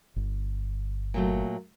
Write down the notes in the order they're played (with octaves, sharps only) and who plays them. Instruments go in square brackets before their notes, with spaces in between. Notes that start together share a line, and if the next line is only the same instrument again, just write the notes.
[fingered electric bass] G1
[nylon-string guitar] A#2 F#3 A3